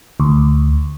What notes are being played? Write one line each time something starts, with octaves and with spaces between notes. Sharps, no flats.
D2